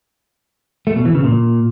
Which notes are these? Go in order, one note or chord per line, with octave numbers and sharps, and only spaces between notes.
A3
B2
E3
C#3
A#2